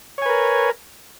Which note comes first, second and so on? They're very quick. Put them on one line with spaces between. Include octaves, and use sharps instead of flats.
C#5 G#5 B4 A#4